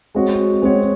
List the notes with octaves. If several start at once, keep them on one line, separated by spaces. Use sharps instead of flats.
G#3 C4 F#4 C#5
G#3 C4 F#4 C#5